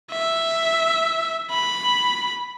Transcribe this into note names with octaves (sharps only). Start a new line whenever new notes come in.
E5
B5